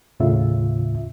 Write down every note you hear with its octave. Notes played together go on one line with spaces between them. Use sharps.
D#2 A2 C#3 F4 E5